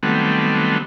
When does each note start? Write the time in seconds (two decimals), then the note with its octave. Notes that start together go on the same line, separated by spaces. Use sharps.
0.03 D#3 F#3 G3 A3 B3 C4